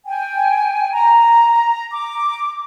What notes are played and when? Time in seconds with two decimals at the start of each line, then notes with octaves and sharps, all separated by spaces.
0.06 G5 G#5
0.93 A#5
1.91 D6